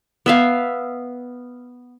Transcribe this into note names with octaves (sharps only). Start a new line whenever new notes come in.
B3 E5 F5